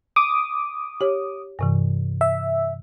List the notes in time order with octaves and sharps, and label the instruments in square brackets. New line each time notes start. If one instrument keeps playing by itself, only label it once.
[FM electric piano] D6 D#6
[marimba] G4 C#5
G2 C3 E3
[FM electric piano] E5